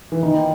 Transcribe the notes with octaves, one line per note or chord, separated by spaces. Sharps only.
E3
A#2 D#3 G3 B3 D#4